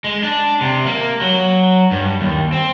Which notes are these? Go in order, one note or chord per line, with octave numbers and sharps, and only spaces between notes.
G#3
D4
C3
A#3
F#3
G2
D#2
C4